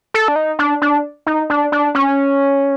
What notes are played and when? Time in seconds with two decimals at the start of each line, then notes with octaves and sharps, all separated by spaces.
0.14 A4
0.28 D4
0.36 D#4
0.59 D4
0.82 D4
1.27 D#4
1.50 D4
1.72 D4
1.95 C#4